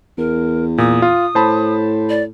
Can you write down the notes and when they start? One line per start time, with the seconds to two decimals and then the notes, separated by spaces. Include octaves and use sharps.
0.18 E2 A#4
0.78 A#2 D#6
1.02 F4
1.35 A2 C5 A5 B5
2.09 D5